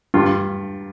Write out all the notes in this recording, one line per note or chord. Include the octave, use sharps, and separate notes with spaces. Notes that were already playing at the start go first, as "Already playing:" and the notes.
G2 F4